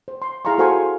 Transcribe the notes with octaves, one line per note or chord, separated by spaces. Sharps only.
C5
C6
E4 G#4 F5 A#5 C6 C#6
F#4 A4 C5 F5 G#5 C#6